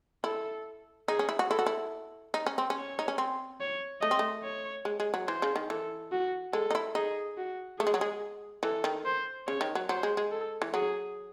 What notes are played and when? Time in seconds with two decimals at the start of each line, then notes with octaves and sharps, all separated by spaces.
0.24 E4 A4
1.08 D#4 G#4
1.19 C#4
1.29 E4
1.39 F#4
1.50 E4 A4
1.59 F#4
1.66 E4
2.34 D#4
2.46 C#4
2.58 C4
2.70 C#4
2.77 C#5
2.99 D#4
3.08 C#4
3.18 C4
3.60 C#5
4.01 A3 D#5
4.11 C4
4.19 A3
4.44 C#5
4.85 G#3
5.00 G#3
5.14 F#3
5.27 E3 C5
5.42 C#3
5.56 D#3
5.70 E3 A4
6.12 F#4
6.53 G#3 A4
6.71 D#4
6.75 E4
6.95 D#4 G#4
7.37 F#4
7.79 A3 G#4
7.87 G#3
7.94 F#3
8.01 G#3
8.63 E3 A4
8.84 D#3
9.05 C5
9.47 C#3 C#5
9.61 D#3
9.75 F#3
9.89 F#3 C5
10.03 G#3
10.17 G#3
10.31 A4
10.62 E3
10.74 F#3 G#4